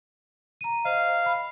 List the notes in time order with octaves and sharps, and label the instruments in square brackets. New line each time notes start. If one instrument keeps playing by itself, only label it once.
[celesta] A#5 D#7
[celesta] C5 D#5 [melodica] F5
[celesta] B5